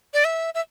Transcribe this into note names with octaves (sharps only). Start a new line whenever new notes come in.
D5
E5
E5